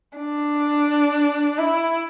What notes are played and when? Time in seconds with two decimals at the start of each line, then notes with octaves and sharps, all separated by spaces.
0.17 D4
1.59 E4